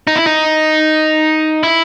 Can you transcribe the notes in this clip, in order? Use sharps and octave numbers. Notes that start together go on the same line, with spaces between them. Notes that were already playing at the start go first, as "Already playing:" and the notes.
D#4
E4
D#4
E4